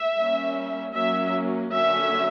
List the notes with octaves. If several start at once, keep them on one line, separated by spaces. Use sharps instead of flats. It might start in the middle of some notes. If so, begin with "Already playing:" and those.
Already playing: E5
G3 A#3 C#4
F#3 A#3 C#4 E5
D3 F#3 A#3 C#4 E5